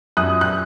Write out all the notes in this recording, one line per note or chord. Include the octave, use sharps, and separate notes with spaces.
F#2 D#6 F#6
F#6